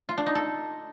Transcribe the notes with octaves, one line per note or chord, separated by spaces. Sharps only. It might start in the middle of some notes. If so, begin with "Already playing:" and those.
F4
D4
D#4
A4